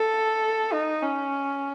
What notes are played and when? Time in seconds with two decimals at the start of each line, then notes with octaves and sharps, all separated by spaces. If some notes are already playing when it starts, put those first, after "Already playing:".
Already playing: A4
0.73 D#4
1.02 C#4